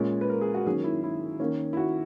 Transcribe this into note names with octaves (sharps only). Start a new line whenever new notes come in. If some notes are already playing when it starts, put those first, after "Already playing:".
Already playing: A#2 G#3 C#4
B4
A#4
G#4
F#4
D#3 F#3 A#3 C#4 G#4
E4
E4
D#3 A#3 C#4
E4
F#4